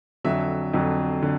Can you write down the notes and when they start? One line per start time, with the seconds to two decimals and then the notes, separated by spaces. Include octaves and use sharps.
0.24 F2 D3 F#3 E5
0.74 F2 D3 F#3
1.22 D3